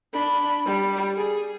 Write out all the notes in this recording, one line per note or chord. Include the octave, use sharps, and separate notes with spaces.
D4 B5
G3
G#4